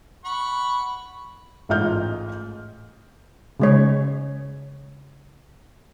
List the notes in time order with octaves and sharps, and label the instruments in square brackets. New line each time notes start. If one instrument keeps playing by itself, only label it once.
[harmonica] F#5 B5 C#6
[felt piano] A1 G#2 F4 D#5 F6 G6
[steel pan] C#3 G#3 C#5